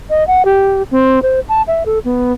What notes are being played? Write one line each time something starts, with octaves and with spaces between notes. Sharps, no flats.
D#5
F#5
G4
C4
C5
A5
E5
A4
B3